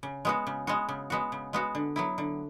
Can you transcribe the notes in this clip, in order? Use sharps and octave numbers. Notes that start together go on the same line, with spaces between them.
C#3
G#3 B3 F#4
C#3
G#3 B3 F#4
C#3
G#3 B3 F#4
C#3
G#3 B3 F#4
D3
F#3 B3 E4
D3